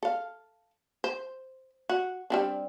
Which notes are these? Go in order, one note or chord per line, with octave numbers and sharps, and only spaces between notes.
A4 F5
C5
F#4
G3 C4 D4